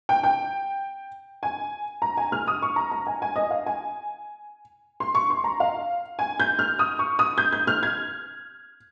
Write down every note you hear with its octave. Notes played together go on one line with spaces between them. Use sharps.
G5
G5
G#5
A#5
G#5
F6
D#6
C#6
A#5
A#5
G#5
G#5
D#5
F5
G#5
C6
C#6
C6
A#5
F5
G#5
G6
F6
D#6
C#6
D#6
G6
G6
F6
G#6